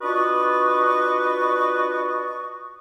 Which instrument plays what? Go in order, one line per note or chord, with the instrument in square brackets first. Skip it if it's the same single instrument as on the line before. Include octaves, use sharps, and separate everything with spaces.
[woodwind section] D4 F4 F#4 B4 D#5 C#6